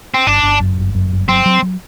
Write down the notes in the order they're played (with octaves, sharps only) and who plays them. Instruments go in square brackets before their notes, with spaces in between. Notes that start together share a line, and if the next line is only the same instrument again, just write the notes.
[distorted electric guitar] C4
[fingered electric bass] G1 [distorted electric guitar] D4
[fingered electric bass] G1
F#2
G1
F#2
G1
[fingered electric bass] F#3 [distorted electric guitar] C4
[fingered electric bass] F#3
F#3